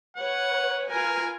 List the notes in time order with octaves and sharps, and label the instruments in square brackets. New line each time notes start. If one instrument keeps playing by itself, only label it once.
[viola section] B4 C#5 [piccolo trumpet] F#5
[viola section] F4 B4 G#5 [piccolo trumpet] A#4